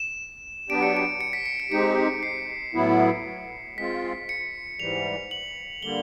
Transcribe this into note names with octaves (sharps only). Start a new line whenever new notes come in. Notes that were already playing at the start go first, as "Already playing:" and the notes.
Already playing: E7
F#3 B3 D4 G4 D7
C#7
D7
C#7
B6
C#7
D7
G#3 C4 D#4 G4 C#7
C7
A2 F#3 B3 E4
G#3 C4 F4 B6
C#7
G#2 E3 G3 F7
F#7
D3 G3 A#3 G7